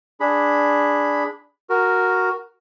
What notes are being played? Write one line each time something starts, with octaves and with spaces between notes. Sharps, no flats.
D4 G#4 B5
F#4 A#4